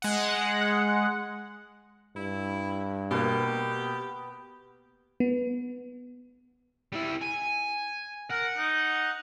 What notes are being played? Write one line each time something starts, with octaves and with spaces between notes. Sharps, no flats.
G#3 F#5
G2 E4
B2 A#3 B3 G4
B3
G3 E4
G#5
A#4 F#5
D#4